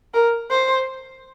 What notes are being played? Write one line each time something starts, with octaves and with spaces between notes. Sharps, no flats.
A#4
C5